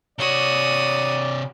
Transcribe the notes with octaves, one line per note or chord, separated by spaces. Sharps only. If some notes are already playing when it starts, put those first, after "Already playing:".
C3 F#4 C#5 D5 D#6